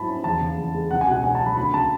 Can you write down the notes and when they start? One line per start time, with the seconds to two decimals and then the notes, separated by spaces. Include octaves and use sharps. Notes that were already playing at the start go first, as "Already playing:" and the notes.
Already playing: G#2 F#3 B3 E4 A5 B5
0.08 C#4
0.24 E2 A5
0.41 C#3
0.57 E2
0.74 G#3
0.91 C#2 F#5
1.01 G#5
1.08 B2 F#5
1.24 C#4 G#5
1.35 A5
1.41 F#3
1.46 B5
1.57 D2 B5
1.74 C#3 A5